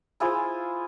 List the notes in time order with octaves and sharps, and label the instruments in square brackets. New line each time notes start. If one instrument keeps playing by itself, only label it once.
[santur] E4 F4 G#4 C5